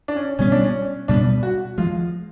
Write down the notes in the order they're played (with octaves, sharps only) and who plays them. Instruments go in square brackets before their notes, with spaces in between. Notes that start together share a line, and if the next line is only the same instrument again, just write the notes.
[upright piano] D4
C#4
[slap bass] B2 G3 B3 [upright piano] C#4
[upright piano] D4
C#4
[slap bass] B2 G3 B3 [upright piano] D4
[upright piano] F#4
[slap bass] F3 G#3 [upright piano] F4